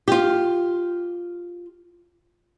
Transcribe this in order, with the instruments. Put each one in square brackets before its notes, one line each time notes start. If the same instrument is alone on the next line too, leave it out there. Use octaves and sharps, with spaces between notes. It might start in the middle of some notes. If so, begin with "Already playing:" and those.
[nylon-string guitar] F4 G4